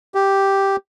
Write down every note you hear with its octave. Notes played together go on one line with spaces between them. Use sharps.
G4